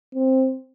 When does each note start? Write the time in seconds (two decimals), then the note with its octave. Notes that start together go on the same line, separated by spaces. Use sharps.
0.15 C4